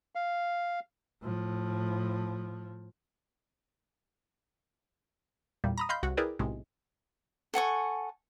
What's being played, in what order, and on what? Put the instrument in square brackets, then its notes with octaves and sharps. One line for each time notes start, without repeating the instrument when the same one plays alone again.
[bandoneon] F5
[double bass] A2 F3
[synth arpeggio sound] E2 A#2 G3
A#5 B5 D#6
D#5 F5 B5 C6 G6
C2 F#4
E4 G#4 A#4 B4 D5 G5
B1 A2 C3 G#3
[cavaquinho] A4 F#5 G#5 C#6